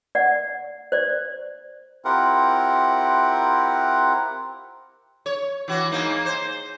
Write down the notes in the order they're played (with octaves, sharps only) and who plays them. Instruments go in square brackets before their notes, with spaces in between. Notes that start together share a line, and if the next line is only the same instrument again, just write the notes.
[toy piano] D5 F#5
C5 D5
[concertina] C4 E4 F4 G4 A#4 F#5
[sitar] C#5
E3 F#4
G#2 A#3 D#4
C5